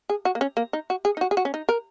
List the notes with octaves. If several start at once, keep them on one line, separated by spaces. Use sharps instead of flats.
G#4
F#4
A#3
C#4
A#3
D#4
F#4
G#4
D#4
F#4
G#4
F#4
C#4
D#4
A#4